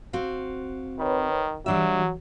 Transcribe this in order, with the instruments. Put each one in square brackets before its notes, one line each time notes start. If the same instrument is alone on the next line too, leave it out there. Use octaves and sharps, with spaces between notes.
[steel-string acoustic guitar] C4 F#4 F5
[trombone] D#3 [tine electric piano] B4 C#5 B5
[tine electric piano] E3 F#4 [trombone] F#3 [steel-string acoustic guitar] G3 D4 E5